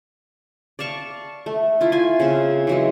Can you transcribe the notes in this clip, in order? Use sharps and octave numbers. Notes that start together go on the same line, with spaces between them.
D5 F5 A5 C#6
A3
E4 F4
F4 G#5
C#3 C4
E3 F#3 G#3